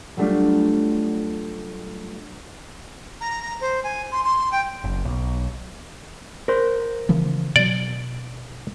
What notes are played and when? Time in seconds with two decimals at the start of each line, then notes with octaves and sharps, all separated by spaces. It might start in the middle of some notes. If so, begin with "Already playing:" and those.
0.17 F#3 G3 A3 D4 F4 G4
3.21 A#5
3.42 A#5
3.61 C5
3.84 G#5
4.12 C6
4.24 C6
4.52 G5
4.84 F#1
5.05 B1
6.48 A#4 C5
7.09 C#3 E3 F3
7.56 B2 F#3 D5